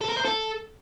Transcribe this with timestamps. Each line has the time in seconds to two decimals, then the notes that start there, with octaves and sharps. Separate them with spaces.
0.01 A4
0.09 A#4
0.17 C5
0.25 A4